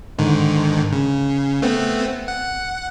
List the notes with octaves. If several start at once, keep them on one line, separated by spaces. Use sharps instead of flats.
G#2 D3 D#3
C#3
A3 B3 C4
F#5